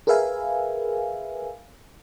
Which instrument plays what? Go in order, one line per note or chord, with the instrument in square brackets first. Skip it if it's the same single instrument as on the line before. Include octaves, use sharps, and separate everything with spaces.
[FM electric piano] G#4 A#4 B4 E5 F5 G#5